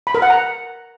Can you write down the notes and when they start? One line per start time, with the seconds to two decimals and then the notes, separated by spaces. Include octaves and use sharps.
0.07 B5
0.15 A#4
0.22 F#5
0.30 A#5